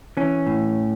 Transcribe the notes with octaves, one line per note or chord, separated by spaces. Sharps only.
E3 C#4
A2